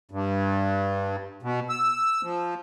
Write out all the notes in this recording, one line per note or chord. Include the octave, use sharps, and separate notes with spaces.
G2
B2
E6
F3